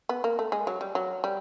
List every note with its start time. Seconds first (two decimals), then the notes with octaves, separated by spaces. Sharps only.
0.09 B3
0.24 A#3
0.39 A3
0.52 G#3
0.67 F#3
0.81 G3
0.95 F#3
1.24 G3